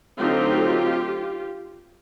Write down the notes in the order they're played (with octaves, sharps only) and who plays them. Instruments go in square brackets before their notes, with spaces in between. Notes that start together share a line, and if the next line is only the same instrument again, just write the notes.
[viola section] D3 F#3 A3 C4 D#4 F4 G4